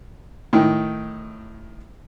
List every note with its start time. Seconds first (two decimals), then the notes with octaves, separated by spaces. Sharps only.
0.53 A2 D#3